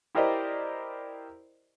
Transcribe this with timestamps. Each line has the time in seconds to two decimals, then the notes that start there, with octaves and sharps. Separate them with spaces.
0.15 E4 G4 A#4 C5 D5 D#5